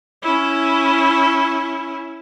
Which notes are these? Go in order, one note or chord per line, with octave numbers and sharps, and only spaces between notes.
C#4 E4